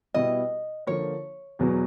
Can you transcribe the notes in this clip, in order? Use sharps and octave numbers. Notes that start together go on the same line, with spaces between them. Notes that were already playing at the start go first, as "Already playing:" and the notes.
B2 G3 B3 E4 D#5
D3 F3 A#3 C#5
E2 B2 F#3 B3